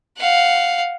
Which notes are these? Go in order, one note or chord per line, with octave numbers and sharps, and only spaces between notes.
F5 F#5